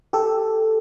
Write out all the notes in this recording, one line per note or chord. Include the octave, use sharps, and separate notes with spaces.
G4 A4